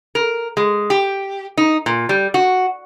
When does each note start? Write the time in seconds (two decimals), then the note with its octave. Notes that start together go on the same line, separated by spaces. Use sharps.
0.15 A#4
0.57 G#3
0.90 G4
1.57 D#4
1.86 A#2
2.09 G3
2.34 F#4